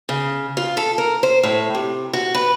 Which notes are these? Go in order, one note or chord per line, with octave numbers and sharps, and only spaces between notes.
C#3
F4
A4
A#4
C5
A2
C3
F#4
B4